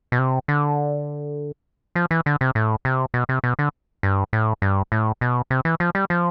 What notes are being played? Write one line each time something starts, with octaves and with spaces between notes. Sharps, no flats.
B2
C3
D3
F3
E3
D3
C3
A2
C3
B2
C3
B2
D3
G2
A2
G2
A2
B2
C3
E3
F3
G3
F3